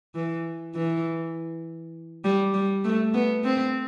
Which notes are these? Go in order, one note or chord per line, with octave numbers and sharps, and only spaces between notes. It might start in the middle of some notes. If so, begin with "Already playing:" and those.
E3
E3
G3
G3
A3
B3
C4